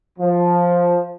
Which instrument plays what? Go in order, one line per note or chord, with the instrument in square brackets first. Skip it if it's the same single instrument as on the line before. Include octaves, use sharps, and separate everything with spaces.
[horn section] F3